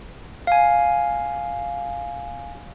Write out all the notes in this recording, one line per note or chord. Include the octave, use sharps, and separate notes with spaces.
F5 G#5